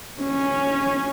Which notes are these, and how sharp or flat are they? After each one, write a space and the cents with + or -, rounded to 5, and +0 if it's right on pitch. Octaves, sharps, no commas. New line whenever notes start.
C#4 -5